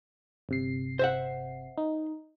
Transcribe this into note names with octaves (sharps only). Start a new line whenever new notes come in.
G1 C3 C7
C5 E5 F#5
D#4